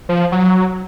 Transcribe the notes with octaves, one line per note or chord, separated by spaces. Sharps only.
F3
F#3